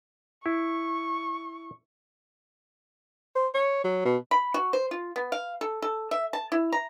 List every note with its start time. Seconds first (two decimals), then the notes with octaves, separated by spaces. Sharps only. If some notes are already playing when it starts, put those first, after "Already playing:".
0.46 E4 C#6
3.35 C5
3.54 C#5
3.84 F#3
4.05 B2
4.31 B5
4.54 F#4
4.73 C5
4.91 F4
5.16 B3
5.32 F5
5.61 A4
5.82 A4
6.11 E5
6.33 A5
6.52 E4
6.73 A#5